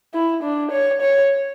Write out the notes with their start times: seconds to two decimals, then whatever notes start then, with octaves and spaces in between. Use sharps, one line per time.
0.14 E4
0.43 D4
0.71 C#5
1.01 C#5